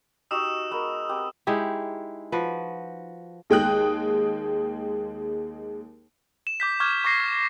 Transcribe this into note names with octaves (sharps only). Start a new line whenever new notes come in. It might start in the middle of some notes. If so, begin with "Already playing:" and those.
D#4 F#4 G4 D#6 E6 E7
G#3 B3 A#4
B3 C4 G4
G#3 D#4 E4 G4
F3 F#4 B4
D#2 G#3 G5 D#6 F#6
E7
D6 G6 B6
C#6 D6 F6 G6 G#6
C#6 D6 A#6 C7
F6 G#6